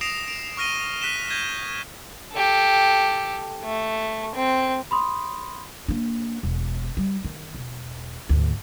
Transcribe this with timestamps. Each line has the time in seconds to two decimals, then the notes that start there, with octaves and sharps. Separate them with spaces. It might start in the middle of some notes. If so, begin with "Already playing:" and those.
0.01 D#6 A#6 C7 D7 E7 F7
0.28 D7
0.57 C#6 F6 A#6 D#7 G7
1.01 F#6 B6 D#7 E7 G7
1.30 G6 G#6 A#6 D#7
2.32 G4 A4
3.64 A3
4.35 C4
4.91 B5 C6 D#6
5.88 A#3 D4
6.43 E1
6.97 G3
7.24 D#3
7.54 E1
8.29 D2 G#2